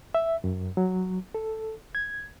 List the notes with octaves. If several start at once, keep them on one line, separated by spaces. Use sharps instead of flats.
E5
F#2
F#3
A4
G#6